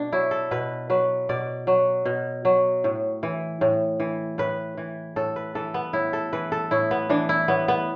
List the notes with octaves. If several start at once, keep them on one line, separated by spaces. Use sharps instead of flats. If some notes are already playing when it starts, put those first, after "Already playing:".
Already playing: B2 D4
F#3 E4
A4
B2 B4
F#3 B4
B2 D5
F#3
B2
F#3
A2
E3
A2
E3
A2 B4
E3
A2 A4
B4
E3 A4
B3
A2 E4
A4
E3 B4
A4
A2 E4
B3
E3 D4
E4
A2 B3
B3